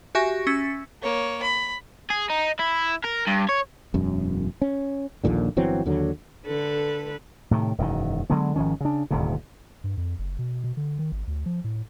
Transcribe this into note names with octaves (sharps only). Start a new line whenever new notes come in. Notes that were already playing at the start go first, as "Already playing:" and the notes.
F#4 G4 E5 G#5 C#6 A#6
C#4 E6 A6 B6 C#7
A#3 C#5
B5
G#4
D#4
E4
A#4
G2
C#5
E1 F#2
C#4
A#1 D#2 A#2 D3
G1 E3 F#3 C4
D#2 D3 F#3
D3 A4 B4
A2 C3 D#3
E1 F#2 C3 D#3
D3 F#3 G#3 B3
G#1 D#3 F3 C#4
C#3 D4
D#1 D2 G#2 C3
G2
F2
F#1
B2
B2
D3
D#3
G#1
D2
F3
A2